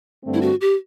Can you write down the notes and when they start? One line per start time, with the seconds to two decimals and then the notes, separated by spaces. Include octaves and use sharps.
0.22 G2 D3 A3 C4
0.34 E4
0.42 F#4
0.61 G4